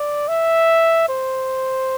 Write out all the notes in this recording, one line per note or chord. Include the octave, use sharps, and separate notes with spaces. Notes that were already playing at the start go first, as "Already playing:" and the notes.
Already playing: D5
E5
C5